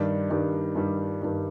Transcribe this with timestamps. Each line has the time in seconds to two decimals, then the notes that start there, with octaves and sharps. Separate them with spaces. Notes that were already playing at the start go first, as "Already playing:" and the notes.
Already playing: G2 D#3 G3 D4
0.30 G2 D#3 G3 D4
0.75 G2 D#3 G3 D4
1.21 G2 D#3 G3 D4